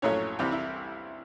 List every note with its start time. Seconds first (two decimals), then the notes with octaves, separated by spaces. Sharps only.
0.02 A#1 A2 F#3 A3 C#4 C#5
0.39 C2 C3 E3 G3 G4
0.52 E4